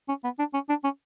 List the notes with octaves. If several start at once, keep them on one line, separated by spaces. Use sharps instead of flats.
C#4
B3
D4
C#4
D4
C#4